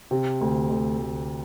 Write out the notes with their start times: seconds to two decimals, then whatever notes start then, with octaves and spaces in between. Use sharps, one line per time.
0.11 C3
0.41 D2
0.70 D2
0.99 D2